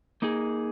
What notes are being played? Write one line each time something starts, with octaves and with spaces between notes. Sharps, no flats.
A#3 D#4 G#4